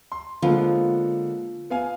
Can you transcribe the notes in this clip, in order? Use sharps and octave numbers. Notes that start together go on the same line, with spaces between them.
C6
D3 F3 G#3 A#3 B3
B3 F5 G#5